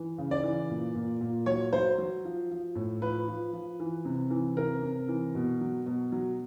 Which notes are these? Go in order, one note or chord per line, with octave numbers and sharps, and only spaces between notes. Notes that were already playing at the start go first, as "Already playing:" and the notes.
Already playing: E3
C#3
D5
E3
A#2
A#2
A#2
F#3 C#5
F#3 C5
F#3
F3
F3
A2
F3 B4
F3
F3
E3
C3
E3
C3 A#4
C3
E3
B2
F#3
B2
F#3